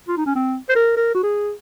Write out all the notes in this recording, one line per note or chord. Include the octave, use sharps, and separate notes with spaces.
F4
D#4
C#4
C4
C5
A#4
A#4
F#4
G#4